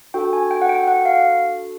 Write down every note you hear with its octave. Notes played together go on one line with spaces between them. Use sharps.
D4 F#4 A4 G5
G#5
G5
F#5
G5
F#5
F5